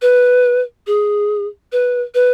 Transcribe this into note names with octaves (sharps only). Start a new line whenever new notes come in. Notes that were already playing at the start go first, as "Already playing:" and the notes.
B4
G#4
B4
B4